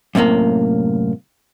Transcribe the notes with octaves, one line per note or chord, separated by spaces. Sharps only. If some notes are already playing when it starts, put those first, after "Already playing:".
F#2 A2 C3 A#3